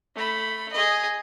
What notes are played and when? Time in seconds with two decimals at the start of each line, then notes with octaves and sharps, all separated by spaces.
0.15 A3 B5
0.72 G#4 D#5